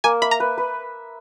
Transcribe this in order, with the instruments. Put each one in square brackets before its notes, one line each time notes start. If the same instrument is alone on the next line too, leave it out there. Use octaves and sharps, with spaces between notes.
[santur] A#3 [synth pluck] G#5
[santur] E5 [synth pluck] B5
[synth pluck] A#5
[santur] B4
B4